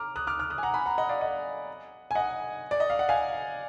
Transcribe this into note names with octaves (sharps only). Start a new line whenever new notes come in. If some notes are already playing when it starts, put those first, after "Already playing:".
Already playing: A#5 D6 F6
D#6 F#6
D6 F6
D6 F6
D#6 F#6
G#5
F#5 A#5
G#5 B5
F#5 A#5
D#5 F#5
D5 F5
D#5 F#5
G#5
D#5 F#5
D5
D#5
F5
F#5
F5 G#5